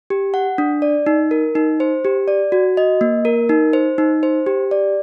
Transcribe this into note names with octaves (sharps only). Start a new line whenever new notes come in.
G4
F#5
D4
D5
D#4
A#4
D#4
C5
G4
D5
F#4
D#5
A#3
A#4
D#4
C5
D#4
C5
G4
D5